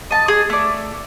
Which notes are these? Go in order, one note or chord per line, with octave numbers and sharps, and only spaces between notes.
D#5 A5
G#4
A3 D5